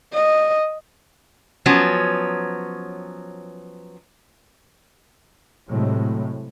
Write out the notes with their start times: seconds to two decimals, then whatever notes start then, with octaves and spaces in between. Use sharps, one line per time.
0.14 D#5
1.66 F3 F#3 B3 C#4
5.69 A2 C3 F#3 G#3